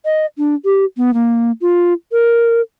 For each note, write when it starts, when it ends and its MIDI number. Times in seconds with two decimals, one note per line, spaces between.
0.05 0.26 75
0.38 0.55 62
0.65 0.85 67
0.97 1.13 59
1.14 1.51 58
1.61 1.93 65
2.12 2.61 70